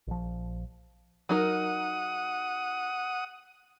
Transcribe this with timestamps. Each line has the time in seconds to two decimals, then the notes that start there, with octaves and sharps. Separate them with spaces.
0.07 A#1 F3
1.29 F#3 D#4 A#4 F#5 D#6